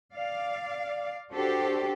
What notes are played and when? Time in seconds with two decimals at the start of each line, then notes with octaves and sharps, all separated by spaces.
0.13 D5 F5
1.32 D4 F#4 G4 A4 C5